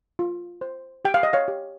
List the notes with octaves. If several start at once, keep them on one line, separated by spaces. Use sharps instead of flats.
F4
C5
G4 G5
F5
D#5
C#5 F5
G4